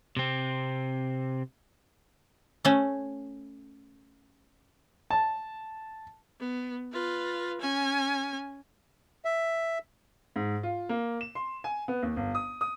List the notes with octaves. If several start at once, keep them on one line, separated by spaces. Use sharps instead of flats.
C3 C4
A3 C#4
A5
B3
F4 B4
C#4 G#5
E5
G#2
F4
A#3
E7
C6
G#5
B3
D#2
G1
D#6
D#6